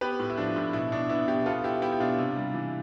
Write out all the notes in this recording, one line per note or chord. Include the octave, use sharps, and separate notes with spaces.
B3 G4 B4
A2
E4
F3 D4
A2
B2 E4
B2 D4
B3 E4
B2 E4 G4
B3 F4 A4
B3 E4 G4
B3 E4 G4
G4
B2 D4 F4
C3
G3
E3